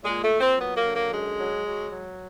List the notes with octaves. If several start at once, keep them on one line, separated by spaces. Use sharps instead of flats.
A#2 G#3
A3
A#2
C4
F#3 B3
A#3
D3
A#3
F#2 G#3
F#3
F#3
F#3